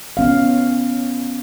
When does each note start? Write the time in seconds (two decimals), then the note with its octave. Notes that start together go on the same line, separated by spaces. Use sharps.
0.17 B3 C#4 F5